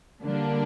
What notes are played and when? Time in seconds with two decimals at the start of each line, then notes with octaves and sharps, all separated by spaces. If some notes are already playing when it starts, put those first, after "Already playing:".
0.22 D3 G3 A#3 D4